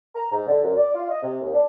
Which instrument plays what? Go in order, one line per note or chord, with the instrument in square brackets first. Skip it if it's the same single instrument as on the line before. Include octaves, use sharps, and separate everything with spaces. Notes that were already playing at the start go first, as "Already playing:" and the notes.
[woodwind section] A#5
G#2
D3
F#2
D5
F4
D#5
C3
D#2
D4